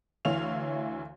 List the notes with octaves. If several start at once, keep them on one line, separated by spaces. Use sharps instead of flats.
D2 E3 E4 C#5 F5 F7